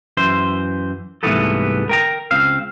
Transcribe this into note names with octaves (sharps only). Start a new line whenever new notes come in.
F#2 E3 C5 C6
C2 G#2 E3 A3 B3 A4
A#4 G5 A#5
C#2 C4 F5